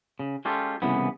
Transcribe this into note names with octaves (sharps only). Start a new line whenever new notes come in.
C#3
G#3 C#4 F4 G4 A4
C2 C#3 E3 B3